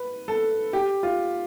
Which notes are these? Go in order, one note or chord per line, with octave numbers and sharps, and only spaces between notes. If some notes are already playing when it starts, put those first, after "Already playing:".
Already playing: B4
A4
G4
F4